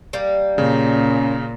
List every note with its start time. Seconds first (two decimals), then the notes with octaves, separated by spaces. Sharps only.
0.13 G3 A#3
0.58 A#2 C#3 C#4